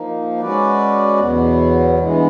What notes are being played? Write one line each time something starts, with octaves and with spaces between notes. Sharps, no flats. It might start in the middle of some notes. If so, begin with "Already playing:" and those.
Already playing: F3 A#3 D#4
G#3 C#4 F#4 B4 D5
E2 B2 F#3 B3
G2 E3 G#3 B3